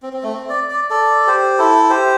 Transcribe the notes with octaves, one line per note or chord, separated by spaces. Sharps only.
C4
C4
A3
C4
D5
D5
A4 D5
G4 C5
E4 A4
G4 C5